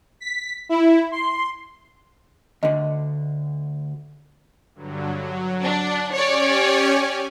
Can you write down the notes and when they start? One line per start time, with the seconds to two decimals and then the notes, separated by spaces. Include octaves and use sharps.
0.20 B6
0.69 E4
1.12 C6
2.63 D2 D3 D#5
4.74 G2 D3 F#3
5.15 F#3
5.64 D4 D5 F#5
6.13 C#4 G4 C#5 D5 G#5